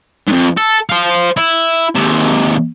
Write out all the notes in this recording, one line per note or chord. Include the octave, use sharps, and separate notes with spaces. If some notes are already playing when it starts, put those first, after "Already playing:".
F2 G#2
A4
C5 F5
E4
D#2 C3